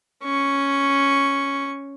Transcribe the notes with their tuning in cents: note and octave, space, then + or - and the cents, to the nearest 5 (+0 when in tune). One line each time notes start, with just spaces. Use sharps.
C#4 +0 C#6 +0